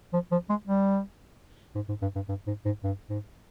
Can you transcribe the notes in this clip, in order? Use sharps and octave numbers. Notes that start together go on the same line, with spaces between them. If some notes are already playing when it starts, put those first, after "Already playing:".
F3
F3
G#3
G3
G#2
G#2
G2
G2
G2
G#2
G#2
G2
G#2